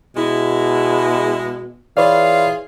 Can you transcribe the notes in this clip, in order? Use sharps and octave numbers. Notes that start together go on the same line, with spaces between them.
B2 G#3 E4
E3 F4 G#4 B4 C#5 D5 F5